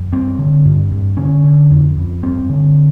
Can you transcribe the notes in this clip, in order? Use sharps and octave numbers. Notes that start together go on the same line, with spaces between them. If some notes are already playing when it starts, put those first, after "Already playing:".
Already playing: F#2
G2 C4
D3
G2
G2
D3 C#4
D3
F2
F2
G2 C4
D3